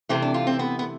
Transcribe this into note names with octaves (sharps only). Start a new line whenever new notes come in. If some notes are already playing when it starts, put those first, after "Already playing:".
C3 E3 A3 C4
D4
F4
C4
B3
B3